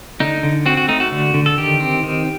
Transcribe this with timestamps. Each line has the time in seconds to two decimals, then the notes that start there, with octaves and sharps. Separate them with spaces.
0.20 D3 D#4
0.43 D3
0.66 C4 F#4
0.77 F#4
0.88 A3 D#4
1.00 F#4
1.12 D3
1.34 D3
1.46 A4
1.58 D#3 G4
1.80 C4
2.03 D#3